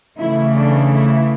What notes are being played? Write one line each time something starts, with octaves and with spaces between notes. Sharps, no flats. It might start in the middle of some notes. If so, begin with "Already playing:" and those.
C#3 E3 A3 E4
D4
E4